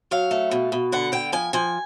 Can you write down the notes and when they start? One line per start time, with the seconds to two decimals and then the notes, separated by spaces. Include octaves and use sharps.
0.11 F#3 F5
0.31 A3
0.51 B2
0.72 B2
0.92 D3 F#5
1.12 D3 G5
1.33 F3 G#5
1.53 F3 G#5